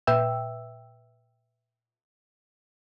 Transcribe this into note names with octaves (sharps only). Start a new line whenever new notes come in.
A#2 B4 E5 G5 E6